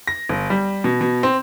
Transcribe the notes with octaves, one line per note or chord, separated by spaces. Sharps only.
A#6
G1
G3
B2
B2
C4